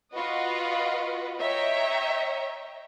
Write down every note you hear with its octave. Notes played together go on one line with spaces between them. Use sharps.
F4 F#4 B4 D#5 F#5
C#5 D#5 E5 G5 A#5